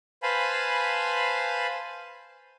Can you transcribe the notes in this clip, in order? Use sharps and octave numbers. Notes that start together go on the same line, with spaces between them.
B4 C5 F5 G#5 A5 B5